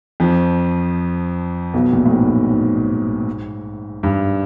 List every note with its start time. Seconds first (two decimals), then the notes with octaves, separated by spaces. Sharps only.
0.20 F2 F3
1.74 B1 B2
1.93 A#1 A#2
2.06 A2
2.12 G#2
2.50 G#2
4.03 G2